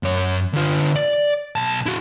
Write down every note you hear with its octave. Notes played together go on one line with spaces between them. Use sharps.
F#2 C#5
D3 F4
D5
B1 A5
E4 F#4